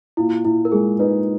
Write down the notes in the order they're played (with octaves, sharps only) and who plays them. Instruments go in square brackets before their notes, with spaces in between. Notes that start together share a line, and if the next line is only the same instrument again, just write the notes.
[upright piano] A#2 [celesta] E4
[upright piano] A#2 [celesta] E4
[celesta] A#4
[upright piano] G#3 [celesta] G#4
[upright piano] D#4 [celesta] B4